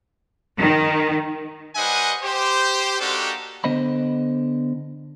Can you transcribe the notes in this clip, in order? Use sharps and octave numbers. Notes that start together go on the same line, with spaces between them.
D#3
G3 B4 C5 D#5 F#5 G#5
G4 C5
A#3 D4 D#4 F#4 G4 A4
D3 B3 C5 D#5 B5